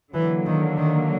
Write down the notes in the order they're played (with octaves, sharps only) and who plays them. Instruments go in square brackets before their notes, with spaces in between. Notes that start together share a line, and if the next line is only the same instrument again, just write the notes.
[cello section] D3 F#3 A#3 [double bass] E3
[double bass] D#3
D#3